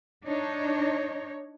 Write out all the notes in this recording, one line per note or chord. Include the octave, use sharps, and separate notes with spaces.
D4 D#4 C#5